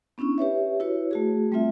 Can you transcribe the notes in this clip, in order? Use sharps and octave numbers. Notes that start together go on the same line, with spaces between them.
B3 C#4 D4 E4 C#6
G4 B4 C#5 E5
E4 F#4 B4 C#5
A3 F#4 G#4
G3 A3 C4 F4 E5